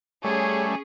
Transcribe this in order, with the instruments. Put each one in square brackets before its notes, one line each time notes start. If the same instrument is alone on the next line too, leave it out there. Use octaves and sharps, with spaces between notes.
[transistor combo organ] G3 A3 [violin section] C#4 G#4 [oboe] C#5